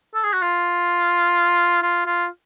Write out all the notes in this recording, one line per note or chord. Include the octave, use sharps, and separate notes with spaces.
A4
G#4
F#4
F4
F4
F4